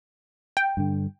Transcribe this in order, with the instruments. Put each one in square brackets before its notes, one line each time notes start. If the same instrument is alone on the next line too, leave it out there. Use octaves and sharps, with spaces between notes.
[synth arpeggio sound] G5
[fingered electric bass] G2 D3